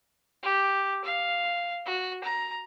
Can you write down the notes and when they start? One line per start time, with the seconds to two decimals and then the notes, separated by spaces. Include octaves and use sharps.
0.43 G4
1.04 F5
1.86 F#4
2.23 A#5